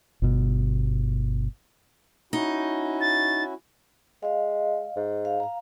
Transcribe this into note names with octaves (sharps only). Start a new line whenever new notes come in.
G1 B2
C#4 D#4 E4 F#4
A6
G#3 D#5 F5
G#2
F5
F5 A#5